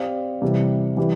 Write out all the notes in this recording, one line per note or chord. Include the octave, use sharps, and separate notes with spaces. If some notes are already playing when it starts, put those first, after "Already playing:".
Already playing: C4 G4 D5 F5
C3 E3 G3
E3 G3